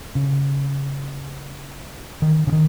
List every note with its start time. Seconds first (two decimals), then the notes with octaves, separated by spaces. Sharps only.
0.15 C#3
2.22 D#3
2.47 C#3
2.52 D#3